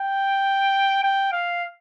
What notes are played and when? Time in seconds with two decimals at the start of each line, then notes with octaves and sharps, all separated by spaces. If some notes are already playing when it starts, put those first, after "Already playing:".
Already playing: G5
1.03 G5
1.33 F5